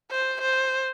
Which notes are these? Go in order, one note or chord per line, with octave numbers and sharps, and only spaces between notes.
C5
C5